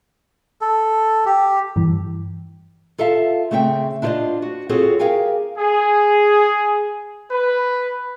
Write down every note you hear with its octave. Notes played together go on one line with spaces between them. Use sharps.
A4
G4
G2 E3
F4 A4 E5 F5 A5
C#3 A3 C4 E5 F5 G5
D4 E4 F4 C5 D5 D#5
F#4
C4 F4 F#4 G#4 A4 C#5
G4 G#4 A#4 F5 G5 G#5
G#4
B4